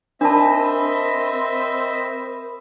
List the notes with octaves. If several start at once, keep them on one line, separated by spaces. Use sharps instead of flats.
C4 D4 A#4 D#5 E5 A5 B5